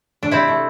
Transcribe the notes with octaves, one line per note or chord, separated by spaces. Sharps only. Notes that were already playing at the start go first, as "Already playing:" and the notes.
D4
C3 C4 E4
A3